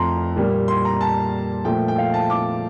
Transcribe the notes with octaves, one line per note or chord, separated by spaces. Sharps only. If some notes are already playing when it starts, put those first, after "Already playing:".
Already playing: F2 F3 A3 A#5 C6
A#2 G3 A#3
C6
A#5
A5
A#2 F3 A3 G5
G5
F5
A5
D6